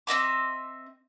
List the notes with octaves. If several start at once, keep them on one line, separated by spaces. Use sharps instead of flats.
C4 D#5 E5 D6